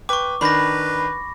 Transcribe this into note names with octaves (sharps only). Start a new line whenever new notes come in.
B4 G5 C#6 D6
D#3 D4 B4 B5 A#6